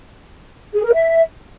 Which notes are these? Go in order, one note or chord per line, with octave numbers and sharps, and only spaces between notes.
G#4
A#4
E5